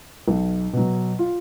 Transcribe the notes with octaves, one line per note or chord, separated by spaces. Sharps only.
B1
B2 F#3
F4